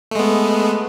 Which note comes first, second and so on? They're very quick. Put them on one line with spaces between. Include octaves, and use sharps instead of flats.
A3 G#3 B3